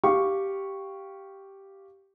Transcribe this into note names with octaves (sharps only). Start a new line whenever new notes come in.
G4 F5 C#6